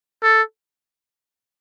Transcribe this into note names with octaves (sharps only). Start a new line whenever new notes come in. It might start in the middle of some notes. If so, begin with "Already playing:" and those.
A4